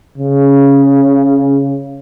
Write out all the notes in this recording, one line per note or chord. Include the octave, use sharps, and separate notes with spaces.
C#3